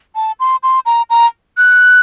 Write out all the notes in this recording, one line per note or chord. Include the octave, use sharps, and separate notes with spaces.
A5
C6
C6
A#5
A#5
F#6